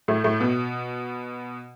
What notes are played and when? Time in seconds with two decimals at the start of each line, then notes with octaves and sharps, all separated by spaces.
0.08 A2 A3
0.24 A2 A3
0.40 B2 B3